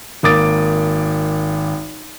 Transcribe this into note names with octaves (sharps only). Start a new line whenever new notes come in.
G#1 A#3 D6 D#6 A6 D7